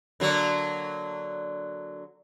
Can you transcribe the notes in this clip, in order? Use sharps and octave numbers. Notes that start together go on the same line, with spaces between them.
D3 F#3 A#3